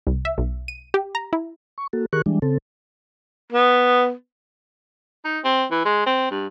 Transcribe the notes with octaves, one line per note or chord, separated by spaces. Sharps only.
C2
E5
B1
D#7
G4
A#5
E4
C#6
A#3 F#4 A4
D#3 G4 G#4 A#4 C#6 F#6
E3 G3 G#3 D4
C#3 C4 A4
B3
D#4
C4
E3
G#3
C4
G2